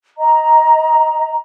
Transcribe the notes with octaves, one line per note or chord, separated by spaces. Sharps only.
D#5 A#5